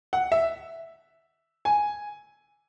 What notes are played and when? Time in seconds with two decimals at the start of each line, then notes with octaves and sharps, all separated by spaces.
0.13 F#5
0.32 E5
1.65 G#5